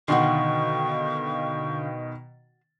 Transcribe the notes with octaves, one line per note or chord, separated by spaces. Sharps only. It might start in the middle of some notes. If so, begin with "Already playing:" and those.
B2 D3 D#3 F#4 F5 G5 C6 C#6